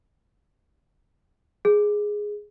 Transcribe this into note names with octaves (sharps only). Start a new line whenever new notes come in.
G#4